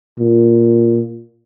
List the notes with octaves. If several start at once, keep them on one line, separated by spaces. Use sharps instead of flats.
A#2